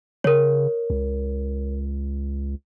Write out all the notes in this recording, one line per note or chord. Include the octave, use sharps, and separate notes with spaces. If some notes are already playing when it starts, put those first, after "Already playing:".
C#3 A#4 C#5
C#2